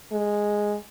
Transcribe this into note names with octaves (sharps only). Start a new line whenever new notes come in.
G#3